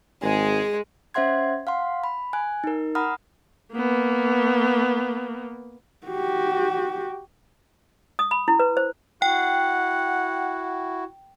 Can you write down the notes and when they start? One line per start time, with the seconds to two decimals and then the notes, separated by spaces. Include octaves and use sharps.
0.23 G#1 G#3 G#4
1.14 C#4 C5 E5 F#5 C6 G#6
1.67 F5 F#5 C6
2.04 B5
2.33 G#5 F#6
2.64 D#4 A#4
2.95 F#5 A#5 B5 D#6 F6
3.73 A#3 B3
6.07 F#4 G4
8.19 D#6
8.31 B5
8.48 E4
8.59 B4
8.77 C5
9.22 E4 F#4 F#5 G5